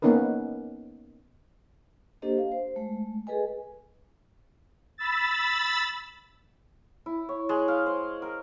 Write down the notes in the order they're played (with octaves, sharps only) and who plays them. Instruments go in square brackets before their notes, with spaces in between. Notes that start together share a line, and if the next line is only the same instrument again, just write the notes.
[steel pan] A#3 B3 C#4 D#4 A#4 B4
[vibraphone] A#3 D4 G4 A4 C5 D#5
F5
C5
G#3 A3
G#4 A4 B4 D#5 G#5
[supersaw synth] B5 E6 A6
[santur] E4
C#5
G#3
F5
C5
A#4